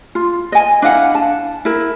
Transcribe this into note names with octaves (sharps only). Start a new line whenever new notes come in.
F4
D#5 G#5
D4 E4 F5 F#5
A5
E4 A#4